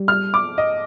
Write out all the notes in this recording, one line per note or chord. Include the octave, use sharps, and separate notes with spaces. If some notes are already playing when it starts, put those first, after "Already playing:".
Already playing: G3
F6
D6
D#5